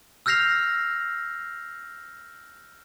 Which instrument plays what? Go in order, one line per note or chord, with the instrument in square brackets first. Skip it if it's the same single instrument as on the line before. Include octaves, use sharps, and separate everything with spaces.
[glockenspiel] E6 F6 G6 A#6 C7 F7